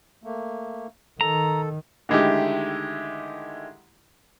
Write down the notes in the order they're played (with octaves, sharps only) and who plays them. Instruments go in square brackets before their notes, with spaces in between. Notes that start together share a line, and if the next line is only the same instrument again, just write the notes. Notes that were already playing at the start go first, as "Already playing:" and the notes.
[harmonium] A3 A#3
[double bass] D#3 [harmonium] A4 [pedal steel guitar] A#5
[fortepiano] D3 D#3 G#3 A3 E4 G4